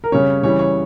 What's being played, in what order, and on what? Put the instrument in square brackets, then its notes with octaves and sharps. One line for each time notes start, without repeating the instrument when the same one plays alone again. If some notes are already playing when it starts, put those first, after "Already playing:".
[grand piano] A#4
C#3 G3 C#4 C#5
C#3 E3 G3 C#5
C#5